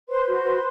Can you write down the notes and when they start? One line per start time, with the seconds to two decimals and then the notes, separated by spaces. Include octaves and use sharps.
0.09 B4 C5 C6
0.26 F#4
0.44 B4